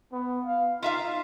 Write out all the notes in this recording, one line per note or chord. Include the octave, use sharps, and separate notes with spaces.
B3
F5
D#4 F4 E5 F5